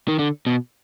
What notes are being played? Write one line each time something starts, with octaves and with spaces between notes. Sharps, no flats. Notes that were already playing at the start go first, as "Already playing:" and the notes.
D#3
D3
B2